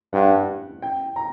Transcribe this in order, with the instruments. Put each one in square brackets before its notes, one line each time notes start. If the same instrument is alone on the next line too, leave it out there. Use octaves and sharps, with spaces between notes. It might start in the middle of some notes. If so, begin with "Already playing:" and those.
[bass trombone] G2 [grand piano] F#5
[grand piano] G5
A#5